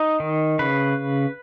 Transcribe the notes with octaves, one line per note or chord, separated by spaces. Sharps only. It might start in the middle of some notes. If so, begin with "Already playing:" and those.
Already playing: D#4
D#3
C#3 B4